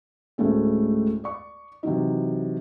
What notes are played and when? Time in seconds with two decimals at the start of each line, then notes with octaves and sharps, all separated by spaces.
0.38 D2 A2 G#3 A3 C#4
1.24 D5 C#6
1.83 C3 E3 F#3 D#4